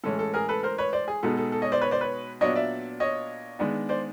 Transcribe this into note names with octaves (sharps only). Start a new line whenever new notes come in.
A2 E3 G#3 C#4 A4
A4
G#4 A#4
A4 B4
A#4 C5
B4 C#5
C5 D5
G#4
B2 G#3 B3 D#4 A4
A4
A4
C#5 D#5
C5 D5
B4 C#5
C5 D5
B4 C#5
A#2 F#3 B3 D4 C#5 D#5
D5 E5
C#5 D#5
D#3 G#3 B3 D4
C5 D5